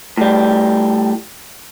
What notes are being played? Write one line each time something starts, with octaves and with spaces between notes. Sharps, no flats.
A2 G3